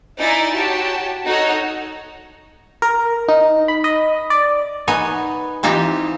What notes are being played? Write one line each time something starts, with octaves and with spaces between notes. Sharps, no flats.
D#4 E4 D5 E5 G#5 A6
F#4 G4 C#5 A5
D#4 F#4 A4 C#5 D#5
A#4
D#4
B5
D#5
D5
B3 D#4 C#5 G#5
E3 C4 D#4 F4 G4